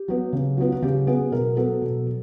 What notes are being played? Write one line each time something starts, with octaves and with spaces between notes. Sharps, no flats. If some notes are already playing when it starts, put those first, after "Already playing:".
Already playing: G4
F#3 B3
C#3
F#3 B3 F4
F#4
C#3 G4
F#3 B3 G#4
B2 A#4
F#3 B3 A4
B2
F#3